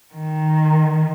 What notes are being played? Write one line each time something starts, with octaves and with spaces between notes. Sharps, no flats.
D#3